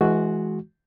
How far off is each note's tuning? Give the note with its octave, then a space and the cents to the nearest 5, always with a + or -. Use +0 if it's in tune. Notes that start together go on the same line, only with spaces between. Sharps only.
E3 +0 G#3 +20 F#4 +0